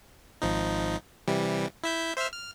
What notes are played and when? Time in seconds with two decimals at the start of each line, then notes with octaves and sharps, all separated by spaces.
0.42 G#1 F3 D#4
1.28 C3 E3 G3
1.84 E4 E5 G6
2.17 C5 E5 F6
2.33 F6